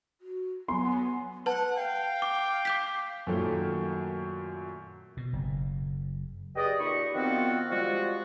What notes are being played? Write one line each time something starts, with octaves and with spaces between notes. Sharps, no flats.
F#4
F#3 B3 G#5 C6
B4 F#5 A5
F5 G5
D6
D6 G6 B6
F#2 A#2 D#3 F#3 A3 A#3
B2
F#1
G4 G#4 B4 D5 D#5
A#2 D#4 G4 B5 C#6
D#3 F3 B3 C4 F4 F#4
F3 G3 G#3 F4 F#4